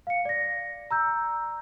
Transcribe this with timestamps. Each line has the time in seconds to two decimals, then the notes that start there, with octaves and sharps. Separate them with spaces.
0.07 F5 C#7
0.25 D5 A#6
0.91 A#5 E6 G6